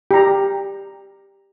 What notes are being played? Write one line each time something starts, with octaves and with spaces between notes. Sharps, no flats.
G4 A#5